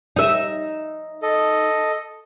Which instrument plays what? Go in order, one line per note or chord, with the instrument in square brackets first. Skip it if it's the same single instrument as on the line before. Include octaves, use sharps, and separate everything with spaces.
[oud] D#4 E5
[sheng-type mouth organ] A4 D#5